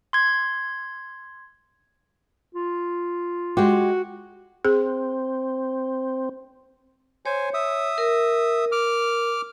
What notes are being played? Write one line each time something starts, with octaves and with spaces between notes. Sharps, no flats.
C6 G#6
F4
G#3 F#4 G4
C4 G#4
C5 C#5 G#5
E5 D#6
A#4
D6 F6